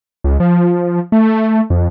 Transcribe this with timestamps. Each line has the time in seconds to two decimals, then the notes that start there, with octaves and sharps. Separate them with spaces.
0.24 C#2
0.40 F3
1.12 A3
1.70 F2